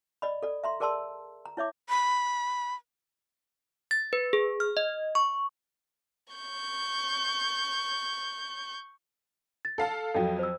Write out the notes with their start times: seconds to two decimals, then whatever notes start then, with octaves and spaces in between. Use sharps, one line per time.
0.22 D5 D#5 B5
0.43 A4 D5
0.64 E5 A#5 C6
0.80 G#4 A#4 D5 A5 C6 E6
1.46 A#5
1.57 E4 C#5 E5 D6
1.89 B5
3.91 A6
4.13 B4
4.33 G#4
4.60 F6
4.77 D#5
5.15 C#6
6.33 C#6 G6
9.65 A6
9.78 A4 F5 A5
10.15 F2 F#3 A4 F5 G5
10.39 C5 E6